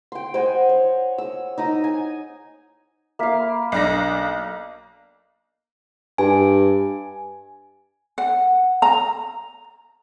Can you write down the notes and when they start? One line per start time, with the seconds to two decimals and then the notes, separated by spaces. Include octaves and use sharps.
0.12 G5 C6
0.34 C5 D#5 F#5 G#5
0.69 C#5
1.18 E6
1.58 D#4 D#5 D#6
1.84 G#5
3.19 A#3 E5 F5 B6
3.40 B5
3.72 B1 D4 D#5 A#6
6.18 G2 G#5
8.18 F#5
8.82 A#5